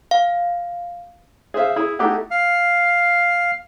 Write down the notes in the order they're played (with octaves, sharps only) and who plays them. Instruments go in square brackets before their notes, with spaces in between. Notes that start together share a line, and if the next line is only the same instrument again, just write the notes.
[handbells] F5
[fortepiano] G#4 C5 E5 F5
E4 G#4
A3 D#4 E4 G4 G#4 F#5
[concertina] F5